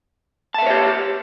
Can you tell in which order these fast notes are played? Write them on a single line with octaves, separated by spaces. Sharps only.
A5 E5 B4 C#5 G4